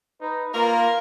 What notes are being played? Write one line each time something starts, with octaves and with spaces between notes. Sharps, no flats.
D#4 B4
A#3 F4 A#4